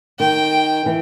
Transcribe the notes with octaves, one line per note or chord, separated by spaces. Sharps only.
D#3 G5
E3